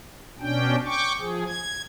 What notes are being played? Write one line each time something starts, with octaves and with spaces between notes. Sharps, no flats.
B2 C#4 D4 G5
G5 C#6 D6
F3 G#4
G#6